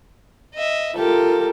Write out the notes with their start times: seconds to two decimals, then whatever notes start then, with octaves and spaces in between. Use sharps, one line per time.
0.55 D#5 E5
0.96 F4 G4 A4 A#4